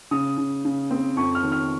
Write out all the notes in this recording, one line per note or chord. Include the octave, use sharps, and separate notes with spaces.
C#3 D#6
C#3
C#3
C4
F2 C#6
F6
D#3
F6